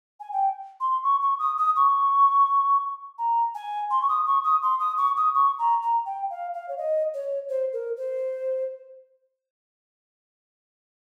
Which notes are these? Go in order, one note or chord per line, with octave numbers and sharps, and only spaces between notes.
G#5
G5
C6
C#6
C#6
D#6
D#6
C#6
A#5
G#5
C6
C#6
D#6
C#6
D#6
C6
D#6
C#6
D#6
C#6
A#5
A#5
G5
F5
F5
C#5
D#5
C#5
C5
A#4
C5